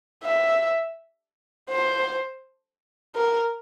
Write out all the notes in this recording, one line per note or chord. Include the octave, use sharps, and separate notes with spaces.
E5
C5
A#4